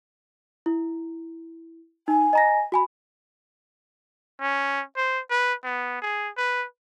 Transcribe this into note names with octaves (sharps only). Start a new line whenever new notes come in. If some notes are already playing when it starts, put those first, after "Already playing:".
E4
D#4 G#5
D#5 A#5 A#6
F#4 G#5 B5
C#4
C5
B4
B3
G#4
B4